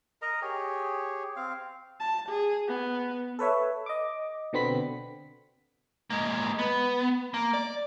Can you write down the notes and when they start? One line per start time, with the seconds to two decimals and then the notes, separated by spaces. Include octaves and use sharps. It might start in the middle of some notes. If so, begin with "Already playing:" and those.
0.22 A#4 D#5 A#5
0.42 G4 G#4 C#5
1.36 C4 F5
2.00 A5
2.29 G#4
2.67 B3
3.39 A4 B4 C#5 E5
3.86 D#5 D6
4.53 B2 D3 B3 C4 B5 B6
6.10 G#3 A#3
6.59 B3
7.34 A#3
7.54 D5